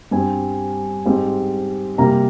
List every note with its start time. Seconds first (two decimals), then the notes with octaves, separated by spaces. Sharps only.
0.11 G2 G3 C4 G#5
1.05 G#2 G3 C4
1.98 C3 G3 A#3 A#5